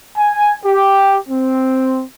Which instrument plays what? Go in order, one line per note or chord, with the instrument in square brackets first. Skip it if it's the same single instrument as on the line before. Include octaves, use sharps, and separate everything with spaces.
[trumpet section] G#5
G4
C4